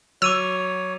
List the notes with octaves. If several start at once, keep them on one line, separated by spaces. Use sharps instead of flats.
F#3 C#5 D6 E6 D#7 F7